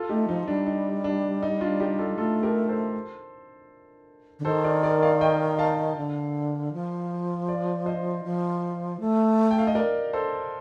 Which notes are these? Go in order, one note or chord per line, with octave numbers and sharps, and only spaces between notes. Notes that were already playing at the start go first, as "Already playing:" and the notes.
Already playing: F4 A4
A3 D#4 G4
F3 D#4
G3 D4
D#4
D4
D#4
D4 F4
D#4 G4
F4 A4
A3 F4 A4
G4 A#4
A4 C5
D3
D#3 A4 C5
A#4 D5
A#4 D5
D5 F5
D#5 G5
F5 A5
D3
F3
D5 F5
C5 D#5
F3
A3
G5
F5
D#5
A#4 D5
A4 C5